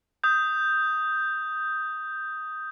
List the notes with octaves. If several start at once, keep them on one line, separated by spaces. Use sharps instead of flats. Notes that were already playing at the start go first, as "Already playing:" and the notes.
D#6 G6